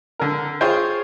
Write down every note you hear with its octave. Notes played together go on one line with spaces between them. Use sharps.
D3 A#4
F4 G#4 C5 C#5 G5